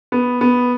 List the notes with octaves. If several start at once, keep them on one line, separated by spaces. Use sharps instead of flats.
B3
B3